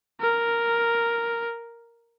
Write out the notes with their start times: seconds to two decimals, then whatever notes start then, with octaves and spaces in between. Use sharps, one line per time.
0.21 A#4